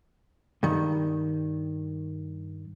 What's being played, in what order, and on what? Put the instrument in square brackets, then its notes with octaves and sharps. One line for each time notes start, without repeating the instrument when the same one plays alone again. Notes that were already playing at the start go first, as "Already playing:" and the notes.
[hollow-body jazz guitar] G2 D#3